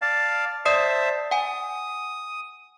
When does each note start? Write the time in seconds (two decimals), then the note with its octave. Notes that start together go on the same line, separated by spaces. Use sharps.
0.02 D5 F5 A5
0.65 C5 D5 E5 A5 D#6 C7
1.31 F#5 G#5 D#6